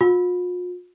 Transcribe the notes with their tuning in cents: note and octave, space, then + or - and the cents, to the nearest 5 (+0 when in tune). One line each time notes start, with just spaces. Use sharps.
F4 +45